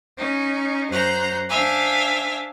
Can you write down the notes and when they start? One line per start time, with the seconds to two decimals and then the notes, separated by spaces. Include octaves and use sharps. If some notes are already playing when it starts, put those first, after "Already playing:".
0.17 C#4 D#4
0.90 F#2 C#4 C5 F#5 A#5 G6
1.49 D4 C5 E5 F5 G#5